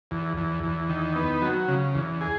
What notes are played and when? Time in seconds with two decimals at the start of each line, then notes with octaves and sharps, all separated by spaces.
0.11 E2
0.37 E2
0.63 E2
0.89 D#3
1.16 B3
1.42 F#3
1.68 C#3
1.95 E2
2.21 G#4